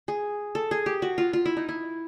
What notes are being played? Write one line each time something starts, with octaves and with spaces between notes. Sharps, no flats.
G#4
A4
G#4
G4
F#4
F4
F4
E4
D#4
E4